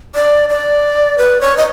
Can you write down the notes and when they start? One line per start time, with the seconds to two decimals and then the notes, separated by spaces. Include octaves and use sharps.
0.15 D5
0.49 D5
1.18 B4
1.41 C#5
1.57 D#5